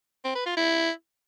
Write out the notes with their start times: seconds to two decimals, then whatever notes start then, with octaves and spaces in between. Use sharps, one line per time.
0.25 C4
0.35 B4
0.46 F4
0.57 E4